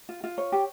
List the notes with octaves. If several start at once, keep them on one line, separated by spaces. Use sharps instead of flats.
F4
F4
C#5
G4